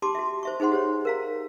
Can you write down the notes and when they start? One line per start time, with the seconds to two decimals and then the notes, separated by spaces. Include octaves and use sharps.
0.02 G4 A5 C6 D6
0.15 F#4 E5
0.43 C5 E5 C#6
0.60 D#4 G#4 C5 F#5 C6
0.72 G4 C5 C#5
1.05 A#4 F5 A#5